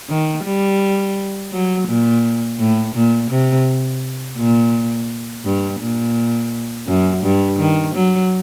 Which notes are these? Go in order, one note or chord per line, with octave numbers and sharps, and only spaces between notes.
D#3
G3
F#3
A#2
A2
A#2
C3
A#2
G2
A#2
F#2
G2
D#3
F#3